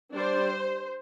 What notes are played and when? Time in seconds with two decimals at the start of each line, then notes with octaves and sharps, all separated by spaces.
0.15 G3 D4 C5